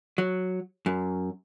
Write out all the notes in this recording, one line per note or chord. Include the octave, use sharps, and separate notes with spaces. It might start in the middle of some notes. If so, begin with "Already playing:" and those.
F#3
F#2